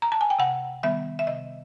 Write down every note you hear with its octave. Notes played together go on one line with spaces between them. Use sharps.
A#5
A5
G#5
G5
C3 F#5
D#3 G3 B3 E5
E5
C3 D#5